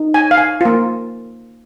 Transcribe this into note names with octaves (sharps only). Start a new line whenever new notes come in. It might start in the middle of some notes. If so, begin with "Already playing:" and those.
Already playing: D#4
G#5
F5
G#5
A#3 F4